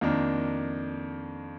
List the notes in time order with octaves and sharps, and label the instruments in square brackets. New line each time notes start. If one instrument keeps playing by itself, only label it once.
[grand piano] F2 D#3 A#3 D4